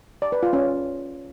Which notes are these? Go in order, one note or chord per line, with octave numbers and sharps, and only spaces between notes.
D5
B4
F4
C#4